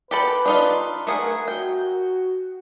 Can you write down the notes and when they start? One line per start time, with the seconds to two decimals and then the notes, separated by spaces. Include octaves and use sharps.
0.11 G4 A4 B4 B5
0.46 D4 D#4 F4
1.07 A3 G#4 A#4 F#5
1.48 F#4 G5